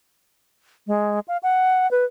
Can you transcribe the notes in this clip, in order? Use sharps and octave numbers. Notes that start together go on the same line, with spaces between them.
G#3
F5
F#5
B4